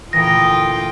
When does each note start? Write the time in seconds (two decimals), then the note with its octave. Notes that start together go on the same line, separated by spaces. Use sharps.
0.13 D2 A#2 E3 F4 G5 D#6 A#6